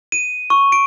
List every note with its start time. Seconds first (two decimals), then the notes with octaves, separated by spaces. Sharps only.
0.12 D#7
0.50 C#6
0.72 D7